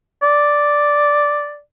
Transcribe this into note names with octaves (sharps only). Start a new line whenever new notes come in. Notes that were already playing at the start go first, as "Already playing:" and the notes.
D5